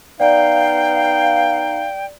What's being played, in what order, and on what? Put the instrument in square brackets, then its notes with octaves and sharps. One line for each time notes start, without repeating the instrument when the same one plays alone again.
[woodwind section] B3 D#4 F5 [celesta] D5 [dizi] G5